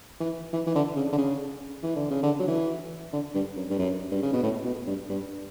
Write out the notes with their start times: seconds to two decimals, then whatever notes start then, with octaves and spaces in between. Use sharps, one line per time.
0.20 E3
0.53 E3
0.67 E3
0.75 D3
0.96 C#3
1.12 D3
1.18 C#3
1.83 E3
1.96 D3
2.11 C#3
2.23 D3
2.40 F#3
2.48 E3
3.13 D3
3.35 G2
3.56 F#2
3.70 G2
3.79 F#2
4.12 G2
4.23 C#3
4.33 B2
4.43 A2
4.65 B2
4.87 G2
5.09 G2